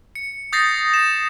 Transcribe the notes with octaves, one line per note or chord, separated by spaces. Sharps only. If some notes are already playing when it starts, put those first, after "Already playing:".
C#7
D#6 G6 A6 A#6 C7
E7